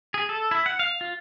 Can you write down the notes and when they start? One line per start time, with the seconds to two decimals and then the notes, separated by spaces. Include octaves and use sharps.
0.14 G#4
0.29 A4
0.51 E4
0.66 F#5
0.79 F5
1.01 F4